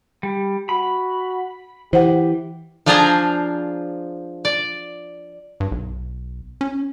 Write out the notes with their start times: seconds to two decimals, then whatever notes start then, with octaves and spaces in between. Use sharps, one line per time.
0.23 G3
0.69 F#4 B5
1.93 E3 G4 C5 F#5
2.86 F3 D4 F4 G#4 C5 A#5
4.45 D5
5.60 G2
5.72 B1
6.61 C#4